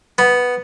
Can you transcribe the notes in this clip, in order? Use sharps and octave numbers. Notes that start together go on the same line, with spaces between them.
B3